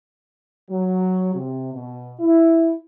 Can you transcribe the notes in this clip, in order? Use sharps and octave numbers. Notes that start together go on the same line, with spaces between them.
F#3
C3
B2
E4